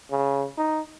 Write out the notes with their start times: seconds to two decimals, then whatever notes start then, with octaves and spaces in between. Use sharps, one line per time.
0.11 C#3
0.58 D#4